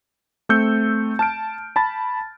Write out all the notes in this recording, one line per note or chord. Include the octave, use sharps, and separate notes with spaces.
A3 C4 E6 G6 C#7
A5 F6 D7
A5 B5 A6